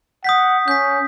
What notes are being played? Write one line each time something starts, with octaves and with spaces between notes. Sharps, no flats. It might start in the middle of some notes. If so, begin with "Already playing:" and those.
F#5 D#6 G6 B6
C#4 G6 B6